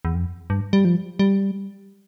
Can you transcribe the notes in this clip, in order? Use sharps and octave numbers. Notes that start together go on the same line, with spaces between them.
E2
F2
G2
G3
F3
G3